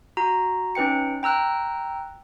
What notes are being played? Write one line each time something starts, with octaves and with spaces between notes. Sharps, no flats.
F#4 A#5
C#4 D#4 B4 G5 C#7
G5 A#5 E6 F#6